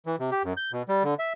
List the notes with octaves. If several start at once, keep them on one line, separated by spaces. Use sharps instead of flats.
E3
C3
G4
F#2
G6
B2
G3
D3
E5